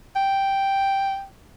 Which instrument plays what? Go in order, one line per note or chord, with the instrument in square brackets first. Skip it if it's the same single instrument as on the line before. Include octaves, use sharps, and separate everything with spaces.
[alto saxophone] G5